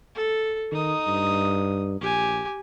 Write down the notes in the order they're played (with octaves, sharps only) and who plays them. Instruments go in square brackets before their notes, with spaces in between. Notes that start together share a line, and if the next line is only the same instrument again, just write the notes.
[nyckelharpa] A4
[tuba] D#3 [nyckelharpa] D#4 D#6
[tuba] G2
[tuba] A#1 [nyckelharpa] G4 G#5